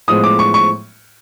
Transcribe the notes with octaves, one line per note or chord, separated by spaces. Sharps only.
A2 F3 G#3 B3 D#6
D6
C#6
C#6